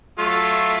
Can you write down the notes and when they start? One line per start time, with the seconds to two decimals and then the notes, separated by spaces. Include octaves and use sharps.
0.19 F#3 A3 F4